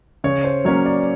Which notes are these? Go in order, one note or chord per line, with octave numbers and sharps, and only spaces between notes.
C#3 C#5
C5
F#3 A#3 C#4 C#5
D5